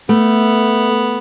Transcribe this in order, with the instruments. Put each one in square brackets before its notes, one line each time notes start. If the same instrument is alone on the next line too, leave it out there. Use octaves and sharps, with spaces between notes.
[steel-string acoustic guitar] A3 [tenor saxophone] B3